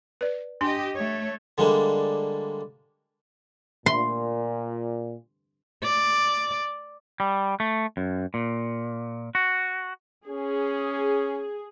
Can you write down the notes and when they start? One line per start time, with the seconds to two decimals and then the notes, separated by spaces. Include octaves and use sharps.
0.21 B4 D5
0.61 D4 G4 D#5 C6
0.95 A3 C#5
1.58 D3 G3 G#3 A#3 D4
3.86 A#2 C6
5.83 D5
7.20 G3
7.60 A3
7.97 F#2
8.34 A#2
9.35 F#4
10.28 C#4 G#4